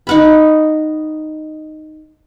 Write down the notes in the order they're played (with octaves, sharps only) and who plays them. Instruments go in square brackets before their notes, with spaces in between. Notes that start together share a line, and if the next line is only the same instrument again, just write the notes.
[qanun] D#4 F#5 B5